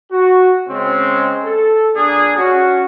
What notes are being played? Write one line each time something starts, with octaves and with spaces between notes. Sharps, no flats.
F#4
C#3 G#3 C4 C#4
A4
A#2 D4 G#4
C#4 F#4